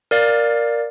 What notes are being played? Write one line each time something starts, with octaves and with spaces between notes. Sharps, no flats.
A#4 D5 F5 A6